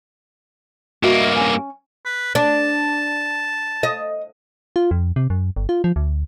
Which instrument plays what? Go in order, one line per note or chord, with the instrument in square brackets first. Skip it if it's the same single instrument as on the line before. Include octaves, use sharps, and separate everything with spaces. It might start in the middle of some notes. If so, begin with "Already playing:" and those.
[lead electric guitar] G2 A#3 [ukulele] F#4 D#5 E5
[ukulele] C#4 G#5
[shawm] B4
[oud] D4 [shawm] A5
[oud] D#5
[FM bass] F4
F2
C3
F#2
G1
F4
F3
D2